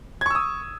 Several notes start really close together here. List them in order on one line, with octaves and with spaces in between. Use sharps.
G#6 C#6 E6 D#6